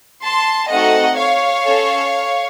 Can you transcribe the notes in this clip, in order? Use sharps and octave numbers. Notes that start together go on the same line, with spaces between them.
A5 C6
A3 C4 D#4 F#4 A4 D#5 F#5
C#5 F5
C#4 A4